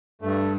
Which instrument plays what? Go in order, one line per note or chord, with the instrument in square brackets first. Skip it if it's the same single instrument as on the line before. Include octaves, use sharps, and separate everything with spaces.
[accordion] G2 A3